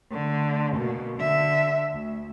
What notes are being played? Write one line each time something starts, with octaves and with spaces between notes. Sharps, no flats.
D3 A3
B2 A#3
D3 E5
D2